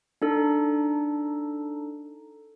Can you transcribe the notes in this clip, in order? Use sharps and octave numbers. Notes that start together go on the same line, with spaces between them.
D4 D#4 A4